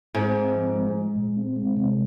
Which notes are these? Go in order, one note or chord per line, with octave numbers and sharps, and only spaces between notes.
G#2 C4
C4
F3
G#3
G#3
A#2
C4
G#3
C3